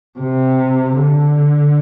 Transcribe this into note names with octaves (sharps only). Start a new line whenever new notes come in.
C3
D3